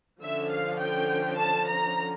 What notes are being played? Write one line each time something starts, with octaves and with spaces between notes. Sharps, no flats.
D3 F3 C#4 E5
F5
G5
A5
A#5